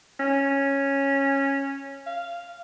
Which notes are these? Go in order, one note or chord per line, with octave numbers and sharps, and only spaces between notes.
C#4
F5